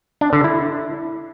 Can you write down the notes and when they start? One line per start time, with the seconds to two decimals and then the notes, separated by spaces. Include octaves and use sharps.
0.21 D4
0.33 D3
0.44 E4